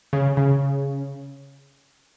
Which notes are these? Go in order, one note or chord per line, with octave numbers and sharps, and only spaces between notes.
C#3
C#3